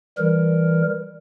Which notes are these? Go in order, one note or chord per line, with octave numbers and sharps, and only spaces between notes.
E3 G3 A#4